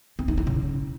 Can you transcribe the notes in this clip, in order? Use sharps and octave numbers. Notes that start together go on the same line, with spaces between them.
C4
D#4
E4
C#3